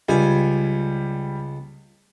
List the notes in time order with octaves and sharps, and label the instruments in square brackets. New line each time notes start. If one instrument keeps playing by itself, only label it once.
[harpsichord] C#2 G#5 [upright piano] G3